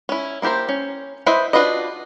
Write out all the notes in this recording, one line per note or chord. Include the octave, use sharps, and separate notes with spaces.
C#4 E4
A#3 E4 G4 A#4 C5
C#4
E4 B4 C5 D#5 E5
D4 F4 F#4 B4 D#5